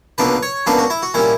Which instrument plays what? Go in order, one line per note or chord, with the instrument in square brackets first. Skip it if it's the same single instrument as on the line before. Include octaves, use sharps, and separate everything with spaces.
[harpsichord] C#2 B2 A#3 D4 B4
C#5
C#2 B2 A#3 D4 B4
F#4
E4
F#4
A#2 G3 C#4 E4